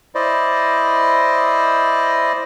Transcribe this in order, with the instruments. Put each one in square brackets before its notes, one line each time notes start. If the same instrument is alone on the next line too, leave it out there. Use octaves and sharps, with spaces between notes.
[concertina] E4 C5 D5 D#5